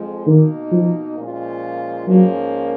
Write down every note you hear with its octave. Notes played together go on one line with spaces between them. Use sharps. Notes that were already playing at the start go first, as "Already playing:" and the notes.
Already playing: F2 F3 G#3
B2 D#3 A#3 D#4
F3
A#2 F3 G#3 C#4 F4
G#2 F3 F#3 A#3 C#4